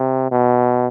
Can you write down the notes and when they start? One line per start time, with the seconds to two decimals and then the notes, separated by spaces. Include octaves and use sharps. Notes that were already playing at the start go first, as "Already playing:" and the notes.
Already playing: C3
0.31 B2